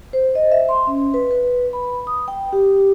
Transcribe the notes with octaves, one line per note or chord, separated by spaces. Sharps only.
C5
D#5
E5
C6
C#4
B4
B4
B5
D#6
G5
G4